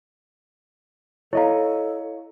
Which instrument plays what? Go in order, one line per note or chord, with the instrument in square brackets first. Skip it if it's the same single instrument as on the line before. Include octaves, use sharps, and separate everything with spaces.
[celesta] E4 F5 [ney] A4 [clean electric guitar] C#5 D#5 A#5